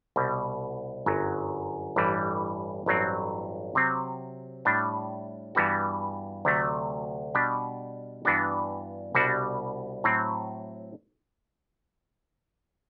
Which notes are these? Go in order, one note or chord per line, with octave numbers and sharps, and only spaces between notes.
C2 B2 G3
G1 F#2 F#3
A1 G2 E3 G3
A1 G2 F#3 C4
C3 F#3 C4
A2 G3 D4
G2 E3 G3 B3 F#4
D2 C3 F#3 A3
B2 G3 D4 G4
G2 E3 B3 D4 F#4
C2 B2 G3 D4 F#4
A2 F#3 C4